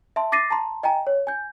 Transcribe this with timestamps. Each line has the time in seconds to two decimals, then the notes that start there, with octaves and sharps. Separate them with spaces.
0.16 E5 A5 C6
0.32 D6 A6 A#6 C7 D#7
0.50 A5 A#5 C6
0.83 D#5 G5 G#5 A#5
1.07 C#5
1.27 G#5 G6